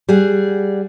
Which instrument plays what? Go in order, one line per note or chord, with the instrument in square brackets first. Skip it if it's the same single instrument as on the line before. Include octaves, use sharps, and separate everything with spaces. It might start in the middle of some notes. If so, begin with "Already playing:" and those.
[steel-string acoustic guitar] G3 G#4 F#5